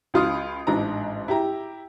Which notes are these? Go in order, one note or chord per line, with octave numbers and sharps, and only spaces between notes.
C#2 F4 D#6
A1 G#2 D4 A#5
E4 G4 A#5